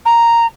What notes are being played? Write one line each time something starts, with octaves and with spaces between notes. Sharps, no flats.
A#5